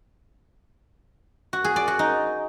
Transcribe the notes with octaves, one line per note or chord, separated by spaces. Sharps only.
F#4
G#4
D5
F#4
D#4